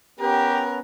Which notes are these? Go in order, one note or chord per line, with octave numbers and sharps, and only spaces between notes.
B3 C#4 G4 A#4 B4